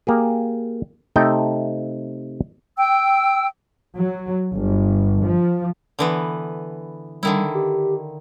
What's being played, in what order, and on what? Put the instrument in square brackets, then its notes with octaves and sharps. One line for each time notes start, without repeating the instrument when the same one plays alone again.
[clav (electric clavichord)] A#3 G4 G#4
C3 A3 D#4 A4 D#5 G5
[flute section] G5 E6
[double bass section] F#3
G1
F3
[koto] D3 E3 B3
[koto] D3 D#3 E4 [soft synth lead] G3
[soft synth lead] G4